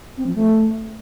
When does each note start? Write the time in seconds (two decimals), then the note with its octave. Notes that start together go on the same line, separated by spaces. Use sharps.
0.17 C4
0.26 F3
0.35 A3